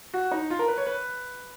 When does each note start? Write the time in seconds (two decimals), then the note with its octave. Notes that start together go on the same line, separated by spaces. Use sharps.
0.14 F#4
0.31 D#4
0.50 F4
0.59 A#4
0.68 B4
0.78 C#5
0.87 B4